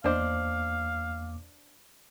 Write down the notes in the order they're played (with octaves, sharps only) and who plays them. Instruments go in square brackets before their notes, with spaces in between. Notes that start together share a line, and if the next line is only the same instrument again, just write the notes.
[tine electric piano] E2 A#3 D6 [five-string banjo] D4 C5 D#5 [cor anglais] F5